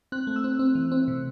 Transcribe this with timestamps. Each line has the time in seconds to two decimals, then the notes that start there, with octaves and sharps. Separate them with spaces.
0.12 C4 F#6
0.27 A3
0.36 E6
0.44 C4
0.59 C4
0.75 E3
0.92 C4
1.08 C3